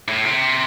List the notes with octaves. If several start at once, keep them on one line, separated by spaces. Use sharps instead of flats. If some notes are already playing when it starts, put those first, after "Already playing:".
A2
C3